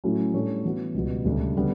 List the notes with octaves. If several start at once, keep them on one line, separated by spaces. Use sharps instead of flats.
A2 F#3 A3 C#4 E4
A2 G3 D4 A4 C#5
E3 B3 F#4
C#2 B2 G3 B3
D2 C#3 G3 D4
D3 G3 B3